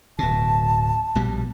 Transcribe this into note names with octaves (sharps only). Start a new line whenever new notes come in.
D1 B2 A5
A#1 B2 G3